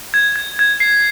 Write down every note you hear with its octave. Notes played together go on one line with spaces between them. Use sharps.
G#6
G#6
G#6
C7